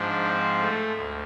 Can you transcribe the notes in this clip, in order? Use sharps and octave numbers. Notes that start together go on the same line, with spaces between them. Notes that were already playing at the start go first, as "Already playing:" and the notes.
Already playing: G#2 F3 D4
C4
A3
D2